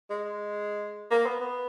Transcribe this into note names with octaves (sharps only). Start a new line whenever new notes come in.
G#3
A#3
B3
B3